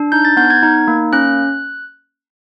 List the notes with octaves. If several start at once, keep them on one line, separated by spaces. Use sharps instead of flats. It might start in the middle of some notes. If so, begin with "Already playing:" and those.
Already playing: D4
D#4 G6
A6
B3 G6
G#6
D#4
A#3
C#4 F#6